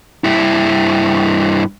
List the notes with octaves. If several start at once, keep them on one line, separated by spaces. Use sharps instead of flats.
G2 E4